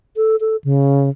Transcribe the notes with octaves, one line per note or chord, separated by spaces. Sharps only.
A4
A4
C#3